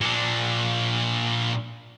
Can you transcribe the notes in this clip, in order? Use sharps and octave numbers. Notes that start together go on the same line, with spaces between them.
A#2 D4